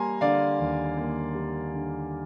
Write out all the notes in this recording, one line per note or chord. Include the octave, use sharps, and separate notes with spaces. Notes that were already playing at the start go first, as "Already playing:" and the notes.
Already playing: G3 A#3 G#5 A#5 C6
D3 D5 F5
D#2
A#3
G3
D3